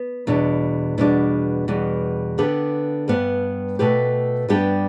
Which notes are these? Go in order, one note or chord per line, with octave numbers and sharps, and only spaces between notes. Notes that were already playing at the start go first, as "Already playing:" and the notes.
Already playing: B3
E2 B2 G3 D4
E2 B2 G3 D4
E2 B2 G3
D3 B3 G4 B4
G2 G3 B3
B2 A3 G4 B4
G2 G3 B3 D4 G4